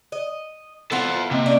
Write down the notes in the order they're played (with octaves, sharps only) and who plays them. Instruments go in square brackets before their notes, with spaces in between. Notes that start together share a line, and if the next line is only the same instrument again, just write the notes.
[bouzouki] D#5
[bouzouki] B3 E4 F4 [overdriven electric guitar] A4 C5
[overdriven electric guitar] C3 [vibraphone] A#3 C4 D#5
[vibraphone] A#3 C#4 D5 [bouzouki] D4 E5